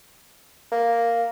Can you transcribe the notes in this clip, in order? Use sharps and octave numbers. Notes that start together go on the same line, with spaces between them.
A#3